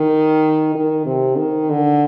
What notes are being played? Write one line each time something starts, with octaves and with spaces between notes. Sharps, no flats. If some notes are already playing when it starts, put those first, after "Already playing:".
Already playing: D#3
D#3
C3
D#3
D3